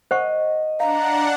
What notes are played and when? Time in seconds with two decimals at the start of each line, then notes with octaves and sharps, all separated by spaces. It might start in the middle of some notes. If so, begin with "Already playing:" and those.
0.11 C5 D#5 F#5 C#6
0.80 D4 F5 F#5 A#5